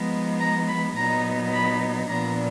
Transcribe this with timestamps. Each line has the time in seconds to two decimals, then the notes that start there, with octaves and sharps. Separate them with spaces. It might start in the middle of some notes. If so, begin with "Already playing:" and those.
Already playing: F3 G#3 B3 D#4
0.39 A#5
0.67 B5
0.95 A#2 F#3 B3 D#4 A#5
1.52 B5
2.08 A#2 F3 B3 D4 A#5